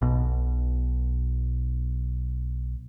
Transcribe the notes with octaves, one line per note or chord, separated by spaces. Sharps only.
B1 B2